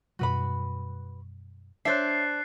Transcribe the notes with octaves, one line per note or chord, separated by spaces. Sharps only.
F#2 B2 G3 F#4 B4 B5
D4 C5 C#5 E5 F#6 A6 C7